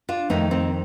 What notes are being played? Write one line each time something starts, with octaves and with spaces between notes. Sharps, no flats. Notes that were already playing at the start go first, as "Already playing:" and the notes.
D4 F4
F2 D#3 A3 C4 D#4
C4 D#4